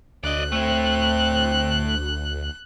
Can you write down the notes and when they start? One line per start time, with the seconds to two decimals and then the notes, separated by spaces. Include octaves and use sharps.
0.23 D2 D5 D#5 F#6
0.52 A3 C4 E4